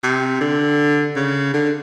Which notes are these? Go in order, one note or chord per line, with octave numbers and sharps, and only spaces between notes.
C3
D3
C#3
D3